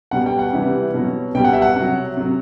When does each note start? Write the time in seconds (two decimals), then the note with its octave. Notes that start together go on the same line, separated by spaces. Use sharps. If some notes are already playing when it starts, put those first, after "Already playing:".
0.11 B2 G3 F#5
0.26 G5
0.39 F#5
0.53 C3 E3 G3
0.94 B2 F#3
1.35 B2 G3 G5
1.44 F#5
1.53 E5
1.62 F#5
1.76 C3 F#3
2.17 C3 F#3